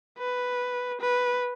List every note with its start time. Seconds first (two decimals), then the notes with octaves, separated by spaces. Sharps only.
0.19 B4
1.01 B4